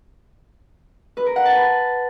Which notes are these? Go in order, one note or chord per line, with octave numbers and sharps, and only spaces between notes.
B4
A#4
F#5
A5
B4